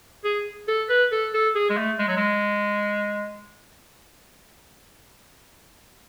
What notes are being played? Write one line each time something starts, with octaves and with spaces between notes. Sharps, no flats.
G#4
A4
B4
A4
A4
G#4
G#3
A3
G#3
F#3
G#3